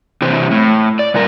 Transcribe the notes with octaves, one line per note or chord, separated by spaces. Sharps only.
C3 E3 C4
A2
D5
G2 A#2 E4 A#4